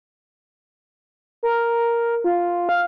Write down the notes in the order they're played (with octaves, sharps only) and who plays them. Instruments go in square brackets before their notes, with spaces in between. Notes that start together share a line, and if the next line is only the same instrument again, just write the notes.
[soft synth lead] A#4
F4
F5